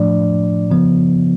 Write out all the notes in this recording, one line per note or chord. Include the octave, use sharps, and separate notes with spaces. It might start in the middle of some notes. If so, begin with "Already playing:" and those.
Already playing: A2 F3 A3 D4 D5
C#3 F3 B3